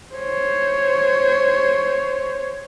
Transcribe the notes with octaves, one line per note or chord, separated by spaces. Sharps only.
C5 C#5